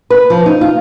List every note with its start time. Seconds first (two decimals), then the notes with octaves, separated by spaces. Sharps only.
0.10 B4
0.30 F3
0.46 D#4
0.61 F4